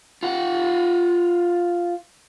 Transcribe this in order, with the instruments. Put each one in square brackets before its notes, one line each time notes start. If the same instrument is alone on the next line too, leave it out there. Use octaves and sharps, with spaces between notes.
[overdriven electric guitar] F4 F#5